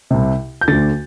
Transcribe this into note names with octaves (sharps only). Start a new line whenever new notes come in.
C2 C3
G6
D2 D3 A6